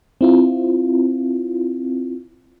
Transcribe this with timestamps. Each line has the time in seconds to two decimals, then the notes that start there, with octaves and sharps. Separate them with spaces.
0.21 C4 E4 F4